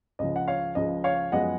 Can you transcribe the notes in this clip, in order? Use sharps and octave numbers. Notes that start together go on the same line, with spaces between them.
C#2 C#3 F3 D#5
F#5
C#5 F5
C#2 C#3 F3 D#5
C#5 F5
F#2 F3 G#3 B3 D#5 F#5